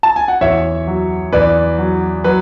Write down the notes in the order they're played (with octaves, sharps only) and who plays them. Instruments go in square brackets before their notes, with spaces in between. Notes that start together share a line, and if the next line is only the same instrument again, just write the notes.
[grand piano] A5
G#5
F#5
E2 C#5 E5
F#3
E2 B4 D5
F#3
F#3 B4